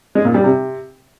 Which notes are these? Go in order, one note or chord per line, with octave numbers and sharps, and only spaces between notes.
G#3
A#2
G3
C3